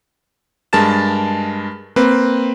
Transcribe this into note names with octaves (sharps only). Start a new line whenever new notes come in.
G2 G#3 A#4 A5 A6 E7
A#3 C4 B4